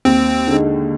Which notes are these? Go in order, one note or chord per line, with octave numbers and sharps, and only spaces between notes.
D#2 C4
D3 G#3 D#4